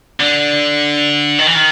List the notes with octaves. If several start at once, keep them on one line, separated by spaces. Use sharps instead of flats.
D3
D#3
E3
D#3